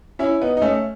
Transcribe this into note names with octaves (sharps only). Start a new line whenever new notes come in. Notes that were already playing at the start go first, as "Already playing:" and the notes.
C#4 E4
B3 D#4
D#4
A3 C#4